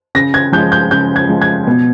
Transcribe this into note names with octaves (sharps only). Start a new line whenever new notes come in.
C#3 A#6
G#6
F3 G#3 G6
G6
C#3 G6
G#6
F3 G#3
G#6
B2